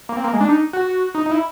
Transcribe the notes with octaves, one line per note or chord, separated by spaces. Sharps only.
A#3
C4
A#3
G#3
D4
D#4
F#4
D#4
D#4
E4